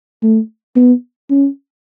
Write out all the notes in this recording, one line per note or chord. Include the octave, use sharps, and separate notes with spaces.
A3
B3
C#4